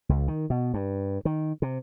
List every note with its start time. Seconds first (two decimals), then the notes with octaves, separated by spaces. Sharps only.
0.09 C#2
0.28 D#3
0.50 B2
0.74 G2
1.25 D#3
1.62 C3